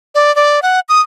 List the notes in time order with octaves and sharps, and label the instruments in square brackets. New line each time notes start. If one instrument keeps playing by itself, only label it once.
[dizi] D5
D5
F#5
D#6